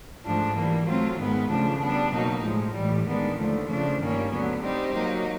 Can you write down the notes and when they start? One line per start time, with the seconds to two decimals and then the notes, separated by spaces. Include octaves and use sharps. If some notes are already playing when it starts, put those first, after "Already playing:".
0.25 G#2 F3 A3 D4
0.56 E3 G3 A#3
0.87 F#3 A3 C4 F4
1.18 G#2 D#3 G#3 B3
1.50 C#3 F3 A3 D4
1.81 G3 B3 D4
2.12 B2 F#3 A#3 D#4
2.43 A2 F3 G#3
2.74 A2 E3 G3
3.05 D#3 G#3 B3 D4
3.38 D#2 D3 F3 A3
3.68 C#3 F3 A3 D4
3.99 G2 D#3 G3 A#3 C#4
4.31 D2 D3 F#3 B3
4.62 G3 C4 D#4 G4 C5
4.93 F#3 A#3 D#4